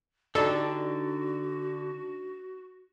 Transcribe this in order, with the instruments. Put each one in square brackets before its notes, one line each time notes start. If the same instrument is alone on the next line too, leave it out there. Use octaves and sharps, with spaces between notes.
[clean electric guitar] D3 [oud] D4 D#4 G4 [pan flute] F#4 [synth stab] A4